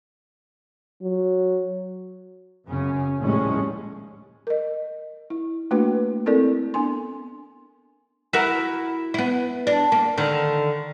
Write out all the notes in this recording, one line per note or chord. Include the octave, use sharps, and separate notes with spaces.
F#3
F#2 C#3 C#4
A#1 D#2 A2 G3 G#3 C#4
A#4 D#5
E4
A3 A#3 D4 F#4 B4
C4 E4 A4 A#4 D5
B3 D4 G#5 C6
E4 F#4 A#4
B3 E4
D4
A#3
D3 D#3